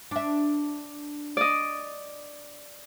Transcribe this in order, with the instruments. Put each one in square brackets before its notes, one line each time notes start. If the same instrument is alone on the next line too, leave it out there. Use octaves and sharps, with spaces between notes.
[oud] D4 E5
[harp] D5 D#5